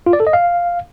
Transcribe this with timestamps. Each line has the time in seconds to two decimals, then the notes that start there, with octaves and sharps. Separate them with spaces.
0.06 F4
0.13 D5
0.20 A4
0.27 D#5
0.33 F5